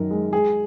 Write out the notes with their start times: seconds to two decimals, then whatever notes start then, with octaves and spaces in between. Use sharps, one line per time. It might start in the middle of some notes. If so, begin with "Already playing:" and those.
Already playing: F#2 D#3 A#4
0.11 G#3
0.32 G#3 G#4